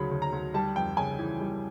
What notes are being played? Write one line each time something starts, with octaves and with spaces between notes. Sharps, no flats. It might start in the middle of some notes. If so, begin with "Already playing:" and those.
Already playing: D2 C#3 F#3 B5
D2
A#5
D2
G3 A5
F2 G5
C#3 G#5
E3
G3